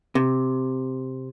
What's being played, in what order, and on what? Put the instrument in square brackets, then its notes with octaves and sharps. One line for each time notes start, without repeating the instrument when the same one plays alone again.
[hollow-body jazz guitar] C3